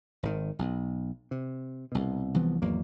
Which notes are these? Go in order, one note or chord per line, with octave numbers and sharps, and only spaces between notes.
G#1 D#3
B1
C3
C2 B2
C2 E3 F3 B3
G#1 E2 F#3 A#3